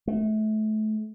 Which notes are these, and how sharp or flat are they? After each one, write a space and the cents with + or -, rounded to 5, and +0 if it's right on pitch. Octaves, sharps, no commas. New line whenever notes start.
A3 -30